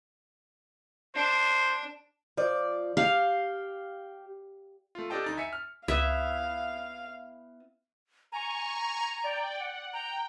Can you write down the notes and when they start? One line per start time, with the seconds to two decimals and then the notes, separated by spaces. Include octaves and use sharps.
1.15 D4 C5
2.37 F3 D5
2.97 G4 F5
4.95 A3 F4
5.10 D4 G4 A4 D#5 G5 A5
5.24 D2 D#4 A6
5.37 E5 G#5 B6 C#7
5.53 F6
5.88 C#2 B3 E4 E5 F5
8.32 G#5 A#5 C#6
9.24 D5 G5
9.60 F#5
9.93 G5 A#5